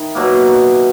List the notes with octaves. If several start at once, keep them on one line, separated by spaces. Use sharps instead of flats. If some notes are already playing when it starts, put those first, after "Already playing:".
Already playing: D#3 E4
B2 F#3 A#3